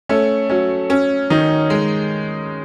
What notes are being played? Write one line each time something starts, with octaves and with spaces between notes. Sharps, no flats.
A3 C#4
F#3 C#4
C#4
D#3 D#4
G#3